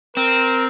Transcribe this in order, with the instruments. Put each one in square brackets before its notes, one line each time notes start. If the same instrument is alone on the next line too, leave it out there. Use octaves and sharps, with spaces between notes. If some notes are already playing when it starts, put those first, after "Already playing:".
[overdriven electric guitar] C4 [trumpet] A#4